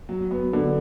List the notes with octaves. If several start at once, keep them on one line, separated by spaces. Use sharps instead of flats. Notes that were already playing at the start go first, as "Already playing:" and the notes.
F#3
B3
D3